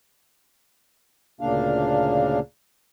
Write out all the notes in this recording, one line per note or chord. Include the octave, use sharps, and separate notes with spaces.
D2 A#2 C#3 A#3 D4 F5